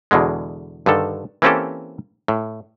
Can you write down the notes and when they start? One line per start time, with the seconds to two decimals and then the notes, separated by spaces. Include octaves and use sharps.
0.11 E2 B2 D3 G#3
0.86 G2 D3 D#3 A4
1.42 E3 A#3 C4 C#4 G4 A4
2.28 A2